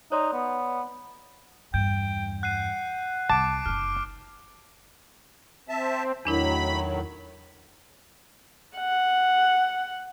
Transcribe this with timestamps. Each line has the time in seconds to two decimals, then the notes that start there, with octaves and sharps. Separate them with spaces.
0.12 D#4 C#5 D5 C6
0.33 B3
1.74 E2 G2 G5 G6
2.43 F#5 F#6 C7 D#7
3.30 C2 A5 D6 D7
3.66 F#1 D#4 F6
5.69 C4 E5 A5
6.25 E2 A2 D#3 F#3 D4 E4 B5
8.76 F#5